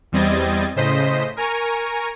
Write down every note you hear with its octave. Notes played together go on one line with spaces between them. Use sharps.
E2 G3 C4 D#5 G#6 A6
A2 C#3 C5 D#5 B6
A#4 G#5 A#5 C#6